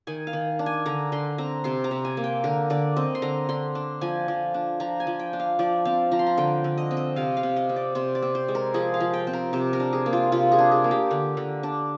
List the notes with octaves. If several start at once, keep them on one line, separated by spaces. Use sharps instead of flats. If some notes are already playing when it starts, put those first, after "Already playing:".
D#3 G#5
F5
D#3
D4
G#5
D3 A#5
D3 C6
C4 A#5
C3 C6
A#5
C3
G#5
A#3
G5
D3 A#4
D3 D5
C4 D#5
C6
D3 A#5
D3 C6
D4
F3 G#5
F3
D4
F3 A#5
G#5
F3
G5
D4
F5
F3 D5
C4 F5
F3 A#5
C6
A#5
D3 G5
D3
D#5
C4
D#5
C3 F5
F5
C3
D#5
C4
D5
C3 C5
D5
C4
C5
G#3
A#4
F3 G#4
F5
F3
G5
C4
A#4
C3 C5
A#4
D4
G#4
A#3
F4
C3 F4
G#4
D4
G#4
A#3
G4
D3
D3
D4